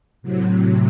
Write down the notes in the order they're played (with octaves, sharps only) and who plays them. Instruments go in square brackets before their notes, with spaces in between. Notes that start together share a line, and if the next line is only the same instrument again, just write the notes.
[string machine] A2 C3 F#3